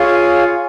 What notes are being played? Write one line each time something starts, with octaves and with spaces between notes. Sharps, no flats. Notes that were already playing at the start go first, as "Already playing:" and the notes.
Already playing: F4 G#4 C#5 F5 G#5